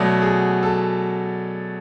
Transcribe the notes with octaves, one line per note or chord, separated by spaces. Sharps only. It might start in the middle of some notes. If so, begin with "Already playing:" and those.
Already playing: B2 F#3 A3 D5
G#4
A4